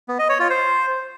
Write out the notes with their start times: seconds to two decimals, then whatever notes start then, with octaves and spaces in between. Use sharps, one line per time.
0.08 B3
0.19 D#5
0.29 C#5
0.40 F4
0.50 C5